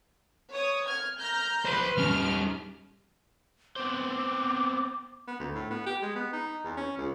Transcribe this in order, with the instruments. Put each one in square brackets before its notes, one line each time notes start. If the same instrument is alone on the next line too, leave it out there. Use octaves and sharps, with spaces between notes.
[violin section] C#5 D#6
F6 G#6
A#5 F6 G6
[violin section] B4 C6 [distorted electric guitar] C5 B5
[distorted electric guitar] G3 C#4 [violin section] F6
[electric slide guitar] B3 C4 C5 [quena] D6
[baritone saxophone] B3
D2
A2
B3
G4
G#3
B3
D#4
E2
C#4
C#2